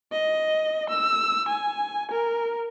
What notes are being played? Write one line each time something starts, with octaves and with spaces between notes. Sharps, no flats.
D#5
E6
G#5
A#4